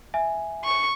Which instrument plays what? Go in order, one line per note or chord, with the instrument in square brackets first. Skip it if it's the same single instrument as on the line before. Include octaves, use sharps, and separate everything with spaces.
[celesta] E5 G#5
[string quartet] C#6